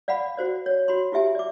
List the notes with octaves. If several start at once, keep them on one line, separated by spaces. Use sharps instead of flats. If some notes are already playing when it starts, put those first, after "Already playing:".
D5 F5 F#5 B5
F#4 C5 D5
C#5
F#4 B5 C6
E4 F4 G4 E5 G#5
D5 D6